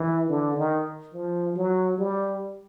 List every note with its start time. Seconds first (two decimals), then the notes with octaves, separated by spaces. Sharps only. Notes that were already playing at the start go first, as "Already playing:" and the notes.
Already playing: E3
0.29 D3
0.57 D#3
1.14 F3
1.56 F#3
1.98 G3